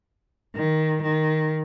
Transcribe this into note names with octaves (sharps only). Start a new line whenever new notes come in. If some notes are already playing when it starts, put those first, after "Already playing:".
D#3
D#3